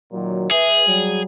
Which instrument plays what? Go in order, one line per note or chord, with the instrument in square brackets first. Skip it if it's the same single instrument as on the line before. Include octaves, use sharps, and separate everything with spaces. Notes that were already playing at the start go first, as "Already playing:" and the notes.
[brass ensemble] A#2 D#3 F#3
[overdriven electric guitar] G#4 [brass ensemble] B4 E5
[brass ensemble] F#3 G3